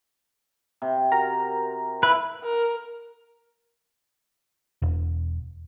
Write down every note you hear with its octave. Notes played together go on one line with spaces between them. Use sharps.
C3
F#4 A#4 A#5
E4 B4
A#4
E1